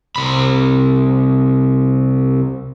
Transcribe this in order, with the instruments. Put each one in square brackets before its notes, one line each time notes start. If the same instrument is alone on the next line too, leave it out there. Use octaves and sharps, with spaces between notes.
[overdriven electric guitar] C2 B5